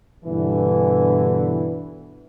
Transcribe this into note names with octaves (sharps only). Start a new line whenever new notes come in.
G2 B2 D3 E3